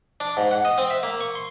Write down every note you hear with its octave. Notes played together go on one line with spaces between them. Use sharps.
D4
G#2
F#5
D#5
C4
E5
A#3
C#6
C6